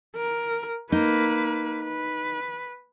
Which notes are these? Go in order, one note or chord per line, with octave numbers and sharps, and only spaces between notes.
A#4
A#3 D#4 B4
B4